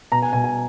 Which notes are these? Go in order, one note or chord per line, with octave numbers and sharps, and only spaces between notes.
B2 A#5
G#5
B2 G#5
G#5